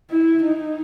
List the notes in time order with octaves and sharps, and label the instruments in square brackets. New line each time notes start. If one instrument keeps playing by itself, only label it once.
[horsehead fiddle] E4
D#4